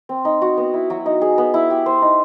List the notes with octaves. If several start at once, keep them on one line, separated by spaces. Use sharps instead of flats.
C4
D#4
F#4
B3
E4
F#3
D#4
G#4
B3
E4
G4
C5
D#4